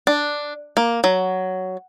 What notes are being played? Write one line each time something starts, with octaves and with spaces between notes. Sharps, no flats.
D4
A#3
F#3